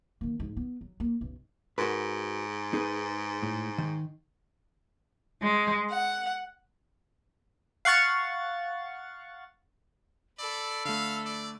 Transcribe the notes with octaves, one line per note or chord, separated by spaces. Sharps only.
D#3 A#3
G#2 G#3
B3
F#3
A#3
B1 F#2
G#2 F#4 A#4 B4
D#4 G#4 B4
A2
D#3
G#3
F#5
F5 F#5 C#6 A6
A4 D5 B5 E6
D3 A3 F5
D5